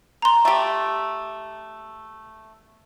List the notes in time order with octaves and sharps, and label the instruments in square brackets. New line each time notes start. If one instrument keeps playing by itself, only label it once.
[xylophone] A#5 C6
[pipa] A3 G4